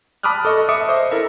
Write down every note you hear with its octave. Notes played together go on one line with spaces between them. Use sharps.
A5 B5 D6 D#6 F6 F#6
A4 D#5 C#6
E5 D6 D#6 C#7
C5 D#5
E4 A4 A#4 E5